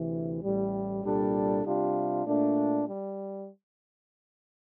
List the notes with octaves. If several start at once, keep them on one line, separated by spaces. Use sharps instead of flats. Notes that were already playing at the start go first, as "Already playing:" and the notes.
Already playing: D2 C3 E3
A1 A2 G3
C2 A#2 G3 D4 A4
C3 G3 D4 F4
A#2 A3 D4
G3